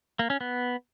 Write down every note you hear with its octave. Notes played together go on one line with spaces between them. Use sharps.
A#3
C#4
B3